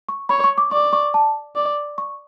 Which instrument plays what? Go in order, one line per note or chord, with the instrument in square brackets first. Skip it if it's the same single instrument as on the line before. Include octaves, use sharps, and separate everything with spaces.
[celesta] C#6
[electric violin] C#5 [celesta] B5
[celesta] C#6
D6
[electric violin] D5 [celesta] C#6
[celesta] C#6
A5
[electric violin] D5
[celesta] C#6